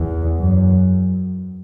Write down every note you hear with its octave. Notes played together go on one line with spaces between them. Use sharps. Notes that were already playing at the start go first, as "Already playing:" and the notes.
Already playing: E2
F#2